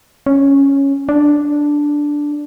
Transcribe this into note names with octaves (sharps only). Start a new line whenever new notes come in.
C#4
D4